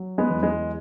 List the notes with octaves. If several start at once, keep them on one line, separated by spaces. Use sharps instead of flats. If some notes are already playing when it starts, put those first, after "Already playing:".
Already playing: F#3
G#3 B3
E2
G#3